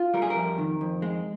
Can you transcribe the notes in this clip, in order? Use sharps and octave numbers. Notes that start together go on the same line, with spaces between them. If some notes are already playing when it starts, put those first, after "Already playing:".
Already playing: F4
G3 A#4
G#4
A#4
F2
D#3
F2
G#3